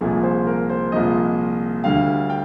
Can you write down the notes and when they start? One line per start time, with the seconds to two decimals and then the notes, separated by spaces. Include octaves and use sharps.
0.01 C2 A#2 F3 G#3 G#4
0.23 C5
0.47 A#4
0.70 C5
0.92 C2 A#2 F3 G#3 D#5
1.84 D2 D3 G3 F5
2.30 G5